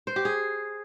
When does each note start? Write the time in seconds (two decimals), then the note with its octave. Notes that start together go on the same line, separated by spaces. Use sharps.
0.07 C5
0.16 G4
0.25 G#4